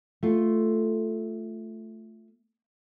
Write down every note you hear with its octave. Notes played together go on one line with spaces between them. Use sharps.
A3 F4